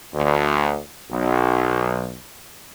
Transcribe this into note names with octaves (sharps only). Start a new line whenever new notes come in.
D2
B1